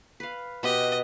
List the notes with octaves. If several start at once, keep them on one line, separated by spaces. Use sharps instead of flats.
B4 F5
B2 G4 D#5 B5